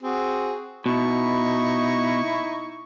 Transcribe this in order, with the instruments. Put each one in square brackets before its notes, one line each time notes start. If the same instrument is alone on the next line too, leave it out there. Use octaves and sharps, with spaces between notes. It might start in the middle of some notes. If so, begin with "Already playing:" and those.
[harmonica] C4 F#4 G#4
[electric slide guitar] B2 [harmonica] D#4 E4 C#6